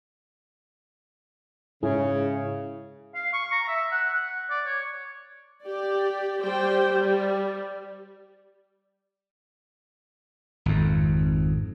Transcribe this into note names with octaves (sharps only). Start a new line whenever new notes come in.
G#2 C#3 E4 G#4
F5
C#6
A#5
E5
F#5
F#5
D5
C#5
G4 D5
G3 G4 C5 G5
G3
G#1 F2